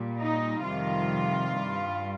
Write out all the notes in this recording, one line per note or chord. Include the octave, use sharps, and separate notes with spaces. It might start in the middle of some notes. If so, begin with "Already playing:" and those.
Already playing: A#2 G3
D#4
F2 C3 D#3 G3 F4
G2 G3